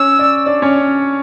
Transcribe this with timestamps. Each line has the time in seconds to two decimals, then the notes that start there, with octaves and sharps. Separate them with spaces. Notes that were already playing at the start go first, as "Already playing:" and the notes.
Already playing: C#4 C#5 E6
0.19 D5
0.46 D4 D5
0.62 C#4 C#5